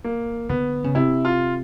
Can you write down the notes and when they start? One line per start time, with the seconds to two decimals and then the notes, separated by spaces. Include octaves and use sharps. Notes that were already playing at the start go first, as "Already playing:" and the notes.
0.04 A#3
0.49 D3 B3
0.84 C#3
0.95 C3 E4
1.25 F4